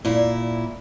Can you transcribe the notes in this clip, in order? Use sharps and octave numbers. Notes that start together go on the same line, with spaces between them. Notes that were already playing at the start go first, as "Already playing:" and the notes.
A#2 E4